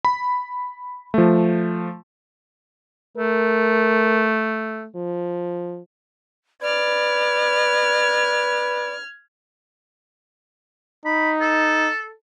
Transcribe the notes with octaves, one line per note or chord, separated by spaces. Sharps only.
B5
F3 A3
A3 A#4
F3
B4 D5 F6 G#6
D#4 B5
A4